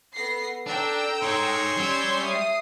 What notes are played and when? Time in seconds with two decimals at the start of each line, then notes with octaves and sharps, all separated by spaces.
0.16 B3 A4 A#6 C7
0.66 D4 G5 A#5 E6
1.22 D#4 G#4 C#5 C6
1.77 G3 C#4 E6 G6 G#6
2.22 E5 D#6 C7